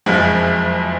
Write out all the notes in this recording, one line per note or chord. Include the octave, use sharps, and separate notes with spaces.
F#1 F2 F3 G#3